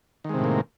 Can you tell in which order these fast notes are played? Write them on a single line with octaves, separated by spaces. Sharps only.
D#3 G#3 C3 A2 A#3